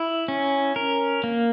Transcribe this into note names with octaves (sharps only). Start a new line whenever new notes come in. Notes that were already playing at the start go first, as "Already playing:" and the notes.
Already playing: E4
C#4
A#4
A#3